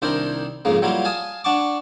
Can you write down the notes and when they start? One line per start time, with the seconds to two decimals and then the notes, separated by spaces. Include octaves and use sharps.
0.02 C2 D#3 D4 E4 A#4 C5
0.65 F2 G#2 C#3 G#3 A#3
0.82 F#3 G3 A#3 E4 F4
1.05 F5 G#5 A5 D#6
1.44 D4 F#5 A5 C#6 D6